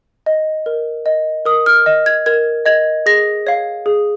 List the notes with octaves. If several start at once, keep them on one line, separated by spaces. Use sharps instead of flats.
D#5
A#4
D#5
A#4 D#6
F6
D#5
G#6
A#4 G#6
D#5 G#6
G#4 A#6
C#5 F5
G#4